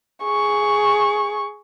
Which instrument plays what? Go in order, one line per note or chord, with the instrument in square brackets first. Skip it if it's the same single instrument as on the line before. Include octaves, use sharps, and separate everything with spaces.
[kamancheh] G#4 C#6